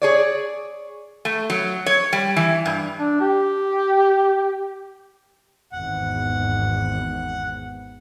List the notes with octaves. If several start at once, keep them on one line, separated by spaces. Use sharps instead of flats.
G#4 C#5 D5
A3
F#3
C#5
G3
E3
G2
D4
G4
G#1 E2 F#5